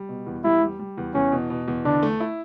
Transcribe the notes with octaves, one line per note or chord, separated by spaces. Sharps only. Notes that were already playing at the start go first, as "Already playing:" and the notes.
Already playing: G3
B2
E2
G3 E4
G3
G3
E2
E2 C#4
B2
B2
E2
D3 D4
A3
E4